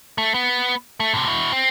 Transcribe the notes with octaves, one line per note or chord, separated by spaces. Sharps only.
A3
B3
A3
A2 C3
E4 F#4
C4